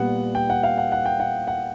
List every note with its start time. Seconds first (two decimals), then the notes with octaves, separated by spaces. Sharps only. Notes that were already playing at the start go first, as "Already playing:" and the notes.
Already playing: A#2 G3 B3 F#5
0.35 G5
0.50 F#5
0.63 F5
0.78 F#5
0.92 F#5
1.06 G5
1.20 F#5
1.47 F#5